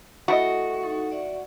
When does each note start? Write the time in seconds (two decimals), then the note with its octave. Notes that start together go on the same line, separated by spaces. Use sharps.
0.28 A3 E4 F#4 A4 D#5
0.83 D#4 A4
1.11 D5 E5 F#5